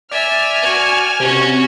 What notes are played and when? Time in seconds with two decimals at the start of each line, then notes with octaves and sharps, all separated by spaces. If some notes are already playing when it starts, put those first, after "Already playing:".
0.11 D5 E5 G#5 F6
0.61 F#4
1.20 C3 C#4 F#4